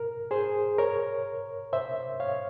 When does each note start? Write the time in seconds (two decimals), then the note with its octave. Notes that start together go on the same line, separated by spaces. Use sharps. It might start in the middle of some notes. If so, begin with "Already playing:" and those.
Already playing: A#4
0.31 G#4 C5
0.79 A#4 C#5
1.73 C5 E5
2.20 C#5 F5